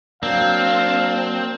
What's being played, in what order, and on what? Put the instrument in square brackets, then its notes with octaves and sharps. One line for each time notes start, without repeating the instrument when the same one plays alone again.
[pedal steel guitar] F#3 A#3 [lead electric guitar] C4 [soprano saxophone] D4 [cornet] F5